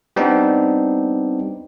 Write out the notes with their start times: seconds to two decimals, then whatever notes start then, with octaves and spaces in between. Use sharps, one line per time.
0.16 G3 B3 C4 D4 D#4